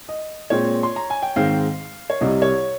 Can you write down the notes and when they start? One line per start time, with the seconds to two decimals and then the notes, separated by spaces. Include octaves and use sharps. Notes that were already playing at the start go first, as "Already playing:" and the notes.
0.09 D#5
0.50 A#2 G#3 C4 C#5
0.83 C6
0.96 A#5
1.10 G#5
1.22 G5
1.36 G#2 D#3 G#3 C4 F5
2.10 C#5
2.21 C2 C3 G3 D#5
2.42 C#5